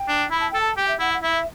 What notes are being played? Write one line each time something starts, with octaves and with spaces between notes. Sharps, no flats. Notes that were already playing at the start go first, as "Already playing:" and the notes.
Already playing: G5
D4
E4 B5
A5
A4 G5
A5
G4 G5
E5
E4 F#5
F#5
E4 E5